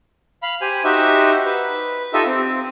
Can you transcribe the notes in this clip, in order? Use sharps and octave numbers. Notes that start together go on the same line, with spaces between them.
F5 B5
G4 C5 G#5
D#4 F#4 G4 C5 E5
B4
D#4 F4 G4 A4 D#5 E5
C4